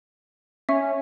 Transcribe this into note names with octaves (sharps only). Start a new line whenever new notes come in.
C#4 E5